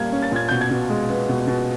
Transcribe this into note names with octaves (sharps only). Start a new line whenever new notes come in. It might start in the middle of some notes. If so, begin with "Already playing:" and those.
Already playing: A#2 G3 A#3 G#6
C#4
A6
A#2 G#6
B2 G6
G#6
B2
G#3
B3
B2
B2